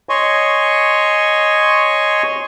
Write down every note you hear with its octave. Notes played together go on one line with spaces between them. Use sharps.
C#5 D#5 G#5 C6 C#6